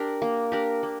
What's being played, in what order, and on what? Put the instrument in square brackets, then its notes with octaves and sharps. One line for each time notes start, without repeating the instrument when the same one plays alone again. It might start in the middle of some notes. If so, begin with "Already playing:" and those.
Already playing: [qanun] D4 G4 A#4
A#3
D4 G4 A#4
A#3